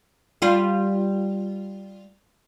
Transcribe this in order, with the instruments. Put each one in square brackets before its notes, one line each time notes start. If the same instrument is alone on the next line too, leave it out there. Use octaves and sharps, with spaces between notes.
[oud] G3 F4